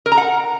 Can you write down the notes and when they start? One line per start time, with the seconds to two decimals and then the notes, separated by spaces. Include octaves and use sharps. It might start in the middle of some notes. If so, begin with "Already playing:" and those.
0.06 A#4
0.12 A#5
0.18 F#5